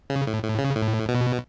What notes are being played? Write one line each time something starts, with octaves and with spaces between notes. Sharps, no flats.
C#3
A2
A2
C#3
A2
B2